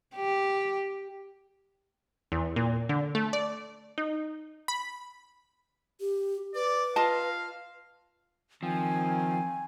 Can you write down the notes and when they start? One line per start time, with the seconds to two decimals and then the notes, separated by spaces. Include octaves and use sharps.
0.15 G4
2.32 E2
2.56 A#2
2.89 D3
3.15 A3
3.33 D5
3.98 D#4
4.68 B5
6.00 G4
6.55 B4 D5
6.96 F4 D#5 F5 A5
8.63 D#3 F3 C4 G#5